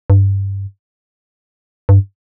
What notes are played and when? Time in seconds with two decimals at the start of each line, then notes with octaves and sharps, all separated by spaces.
0.10 G2
1.89 G2